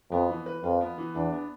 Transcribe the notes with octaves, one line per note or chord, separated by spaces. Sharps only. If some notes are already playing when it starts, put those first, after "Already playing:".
F2 B3
E3
B4
F2 F4
B3
E3
E2 D4
B3